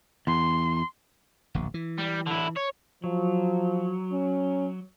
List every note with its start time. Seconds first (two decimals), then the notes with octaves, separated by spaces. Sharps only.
0.27 E2 C6
1.55 D1 A#1
1.74 E3
1.99 G3
2.27 D3 E4
2.57 C#5
3.04 F3 F#3
4.12 C#4